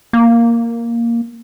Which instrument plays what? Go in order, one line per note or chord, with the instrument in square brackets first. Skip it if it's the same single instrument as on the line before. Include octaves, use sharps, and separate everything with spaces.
[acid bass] A#3